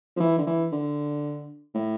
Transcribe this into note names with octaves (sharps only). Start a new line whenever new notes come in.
F3
E3
D3
E3
D3
A2